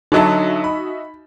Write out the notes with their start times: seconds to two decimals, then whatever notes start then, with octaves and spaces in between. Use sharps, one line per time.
0.12 D3 F#3 D#4 F#4 D#5 E5 A5
0.64 B5